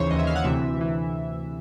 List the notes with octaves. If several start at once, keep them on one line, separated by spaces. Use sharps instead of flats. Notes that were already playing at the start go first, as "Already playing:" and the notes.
Already playing: D#2 C#3 E3 C5 C#5
D#2 C#3 E3 D#5
E5
F5
F#5
D2 C3 E3 E5
D2 C3 E3